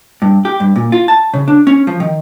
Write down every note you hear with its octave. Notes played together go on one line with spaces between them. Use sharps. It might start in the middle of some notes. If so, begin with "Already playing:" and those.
G2
G4
G2
A#2
F4
A5
C#3
D4
C#4
F3
D#3